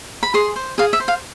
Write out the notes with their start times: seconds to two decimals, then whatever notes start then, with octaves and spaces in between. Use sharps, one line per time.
0.23 B5
0.34 G#4 C6
0.56 C5
0.78 G#4 F5
0.93 E5
1.00 C5
1.08 F5